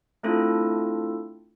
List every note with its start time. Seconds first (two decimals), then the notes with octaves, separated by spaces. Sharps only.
0.23 A3 C4 D4 E4 F4 A4